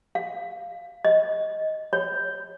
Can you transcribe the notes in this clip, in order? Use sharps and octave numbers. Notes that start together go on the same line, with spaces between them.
F5
D#5
C#5